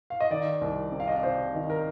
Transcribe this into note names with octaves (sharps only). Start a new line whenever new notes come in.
F5
D#5
D#3 D5
C2
C3
F5
D#5
D5
C3 C5
D#3
A#4